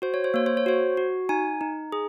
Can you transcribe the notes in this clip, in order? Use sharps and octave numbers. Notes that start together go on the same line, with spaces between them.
F#4 C5
C#5
C5
A#3 C#5
C5
C#5
F#4 C5
F#4
D#4 G#5
D#4
G#4